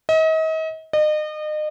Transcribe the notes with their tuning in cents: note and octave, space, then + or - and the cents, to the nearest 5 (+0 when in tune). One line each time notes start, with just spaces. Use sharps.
D#5 +40
D#5 -35